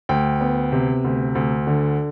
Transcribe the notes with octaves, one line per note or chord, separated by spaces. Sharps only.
D2 G5
B3
C3
D2
D2
D3